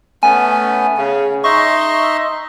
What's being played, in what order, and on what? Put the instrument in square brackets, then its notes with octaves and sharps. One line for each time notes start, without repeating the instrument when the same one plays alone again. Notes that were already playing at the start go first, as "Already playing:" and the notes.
[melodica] A3 B3 C#4 [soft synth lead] G#5
[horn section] C#3 [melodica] C#4
[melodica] D#4 D#5 C6 [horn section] E5 [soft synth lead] C#6